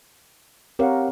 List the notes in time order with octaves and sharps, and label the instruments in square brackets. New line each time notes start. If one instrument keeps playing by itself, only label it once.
[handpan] C4 A#4 C#5 [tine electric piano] G4 F5 F#5